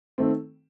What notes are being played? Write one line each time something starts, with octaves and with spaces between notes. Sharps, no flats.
D#3 A3 C4